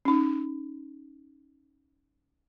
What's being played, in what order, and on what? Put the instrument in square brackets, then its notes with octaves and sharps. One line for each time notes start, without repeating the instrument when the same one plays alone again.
[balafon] C#4 D#4